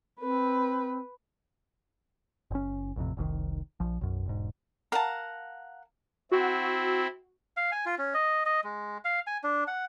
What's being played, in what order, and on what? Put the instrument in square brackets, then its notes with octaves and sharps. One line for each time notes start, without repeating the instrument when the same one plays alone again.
[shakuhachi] C4 [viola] B4
[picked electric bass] F#1 C#4
A1 F2 C3
F1 C2 G#2 D#3
A#1 F3
B1 F#2
E1 G#2
[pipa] A#4 A5 [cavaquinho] F5 F#5 A#5
[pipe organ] C4 E4 [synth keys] F#4
[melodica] F5
G#5
F4
C#4
D#5
D#5
G#3
F5
G#5
D4
F#5